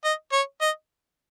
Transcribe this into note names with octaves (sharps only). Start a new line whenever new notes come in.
D#5
C#5
D#5